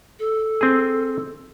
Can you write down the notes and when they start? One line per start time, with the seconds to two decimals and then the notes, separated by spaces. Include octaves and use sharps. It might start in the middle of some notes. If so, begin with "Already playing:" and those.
0.19 A4
0.61 C4 G#4